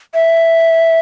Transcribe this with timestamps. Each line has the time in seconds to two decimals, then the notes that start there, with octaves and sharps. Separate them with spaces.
0.14 E5